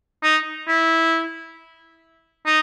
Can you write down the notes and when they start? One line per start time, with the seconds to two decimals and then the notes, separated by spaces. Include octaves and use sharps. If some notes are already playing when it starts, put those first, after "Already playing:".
0.23 D#4
0.68 E4
2.46 D#4